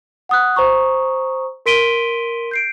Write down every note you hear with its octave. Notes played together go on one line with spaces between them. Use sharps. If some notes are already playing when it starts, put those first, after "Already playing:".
F#5 D#6 F#6
C5 A#5 C#6 D#6
A#4 C6 B6 D7 D#7 G7
G6 C7 D7